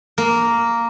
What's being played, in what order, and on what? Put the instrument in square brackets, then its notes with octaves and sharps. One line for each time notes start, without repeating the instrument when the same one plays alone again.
[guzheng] A#3